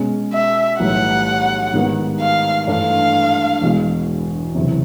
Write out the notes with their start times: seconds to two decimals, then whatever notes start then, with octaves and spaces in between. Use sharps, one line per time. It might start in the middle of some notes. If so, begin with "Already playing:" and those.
Already playing: B2 G#3 C#4
0.33 E5
0.80 B1 A2 E3 G3 F#5
1.74 G#2 D#3 G3 B3
2.21 F5
2.67 G2 E3 A3 D4 F5
3.61 E1 E2 B2 G#3
4.55 F#1 E2 C3